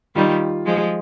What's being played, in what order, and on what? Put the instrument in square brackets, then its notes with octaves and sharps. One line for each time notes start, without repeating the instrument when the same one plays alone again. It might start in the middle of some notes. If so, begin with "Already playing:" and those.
[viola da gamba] D#3 G3 [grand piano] F4
[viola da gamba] F3 G#3